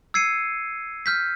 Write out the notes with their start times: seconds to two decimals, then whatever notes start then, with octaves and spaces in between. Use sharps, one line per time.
0.14 E6 G#6 C7 C#7 D#7
1.06 F6 G6 B6